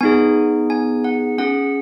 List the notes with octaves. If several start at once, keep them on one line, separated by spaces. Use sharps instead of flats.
B3 D#4 G#4 G#5
G#5
F#5
C#4 G#4 F#5